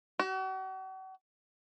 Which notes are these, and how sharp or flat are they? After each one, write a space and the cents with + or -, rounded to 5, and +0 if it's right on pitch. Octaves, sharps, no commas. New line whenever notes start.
F#4 +40